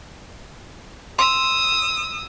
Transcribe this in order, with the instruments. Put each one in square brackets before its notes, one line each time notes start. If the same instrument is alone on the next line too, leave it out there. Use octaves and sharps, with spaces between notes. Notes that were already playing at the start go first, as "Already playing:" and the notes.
[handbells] C6 [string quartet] D#6 E6